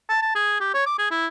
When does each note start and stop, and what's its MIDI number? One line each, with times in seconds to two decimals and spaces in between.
0.09 0.22 81
0.22 0.31 81
0.35 0.57 68
0.60 0.73 67
0.74 0.85 73
0.86 0.94 86
0.98 1.06 68
1.11 1.27 64